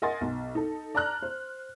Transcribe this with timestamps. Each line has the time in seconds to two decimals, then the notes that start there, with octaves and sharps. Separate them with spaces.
0.02 A#4 D#5 F#5 G#5 C6 A6
0.21 B1
0.55 D#4 A4
0.95 D5 A5 A#5 F6 F#6
1.22 C5